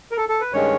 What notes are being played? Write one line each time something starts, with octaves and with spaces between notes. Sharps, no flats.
A#4
A4
A4
B4
G2 D#3 G#3 C#4 C#5